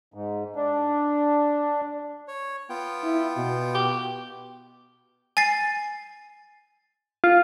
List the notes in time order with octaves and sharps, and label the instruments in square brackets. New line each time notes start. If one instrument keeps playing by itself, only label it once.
[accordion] G#2
D4
[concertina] C#5
B3 F4 G5
[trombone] E4
B2
[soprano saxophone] G4
[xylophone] G#5 A6 C7
[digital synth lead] F4